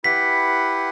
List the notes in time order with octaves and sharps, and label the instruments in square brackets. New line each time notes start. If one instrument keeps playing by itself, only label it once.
[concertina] E4 G4 B4 F#5 [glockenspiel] B6